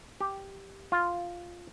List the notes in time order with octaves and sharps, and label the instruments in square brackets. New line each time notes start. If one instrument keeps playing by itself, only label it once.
[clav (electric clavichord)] G4
F4